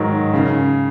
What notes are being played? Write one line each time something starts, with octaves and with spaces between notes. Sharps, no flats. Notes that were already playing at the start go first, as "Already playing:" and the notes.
Already playing: G#2 D#3 F#3
C#3